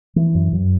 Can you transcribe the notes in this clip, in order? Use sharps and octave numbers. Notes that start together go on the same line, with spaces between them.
E3
F#2
F#2